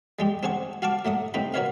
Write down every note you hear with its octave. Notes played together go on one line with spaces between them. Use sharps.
G3 G#3 G4
C4 D4 G#4 F#5 C#6
F#4 F5 F#5 A5 C#6 D6
F#3 A3 F#5 D#6
A2 C3 C4 D#4 G5 B5
F#4 A#4 B4 C#5 D#5 F5